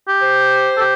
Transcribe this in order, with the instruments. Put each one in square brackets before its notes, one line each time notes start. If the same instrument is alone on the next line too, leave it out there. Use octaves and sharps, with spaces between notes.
[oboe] G4
[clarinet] C5
[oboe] A4
G4